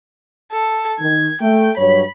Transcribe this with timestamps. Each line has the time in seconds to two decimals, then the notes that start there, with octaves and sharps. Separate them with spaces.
0.52 A4
1.00 D#3 G#6
1.41 A3 G5
1.77 G2 F#3 C#5 B5